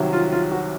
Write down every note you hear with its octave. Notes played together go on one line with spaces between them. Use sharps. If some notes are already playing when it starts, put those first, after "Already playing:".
Already playing: C2 C3 D#3 F#3
F4
F4
F#4